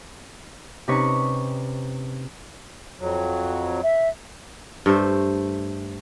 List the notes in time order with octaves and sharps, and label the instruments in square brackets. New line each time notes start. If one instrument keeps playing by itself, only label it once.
[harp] C3 C#4 D#4 B4 C#6
[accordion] F2 F#3
[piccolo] E5
[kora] G2 A3 C5